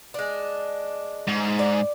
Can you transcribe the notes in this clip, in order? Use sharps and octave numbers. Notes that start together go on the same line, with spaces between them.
G#3 D4
G#2
D5